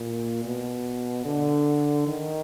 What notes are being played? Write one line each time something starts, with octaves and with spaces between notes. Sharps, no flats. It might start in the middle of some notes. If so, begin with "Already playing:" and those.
Already playing: A#2
B2
D3
D#3